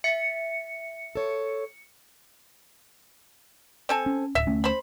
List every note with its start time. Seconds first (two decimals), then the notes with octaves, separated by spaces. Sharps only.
0.04 E5 A6 B6 C#7
1.15 A4 C#5
3.89 C4 A4 G#5
4.06 C#4
4.35 D1 E5
4.47 D2 A3 C#4
4.64 C5 B5